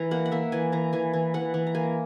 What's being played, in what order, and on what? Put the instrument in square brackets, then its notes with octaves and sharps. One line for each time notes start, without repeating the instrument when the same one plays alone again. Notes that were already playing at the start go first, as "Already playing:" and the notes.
Already playing: [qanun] E3 A#5
A#3 F#5
F#5
A#3 E5
E3 G#5
E3 A#5
E3 G#5
E3
E3 F#5
E3
A#5
A#3 G#5